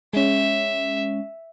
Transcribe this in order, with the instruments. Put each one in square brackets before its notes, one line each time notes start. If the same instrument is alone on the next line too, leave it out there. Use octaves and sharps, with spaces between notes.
[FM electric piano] G#3 C#4 [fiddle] E5